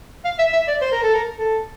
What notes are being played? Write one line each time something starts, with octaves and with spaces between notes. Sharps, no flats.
F5
E5
E5
D5
C5
A#4
A4
A#4
A4